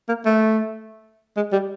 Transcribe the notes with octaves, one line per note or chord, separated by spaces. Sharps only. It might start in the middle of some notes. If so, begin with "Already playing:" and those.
A#3
A3
G#3
G3